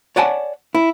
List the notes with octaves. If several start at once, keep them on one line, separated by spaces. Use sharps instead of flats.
C#5 D5 F#5 G#5 A5
E4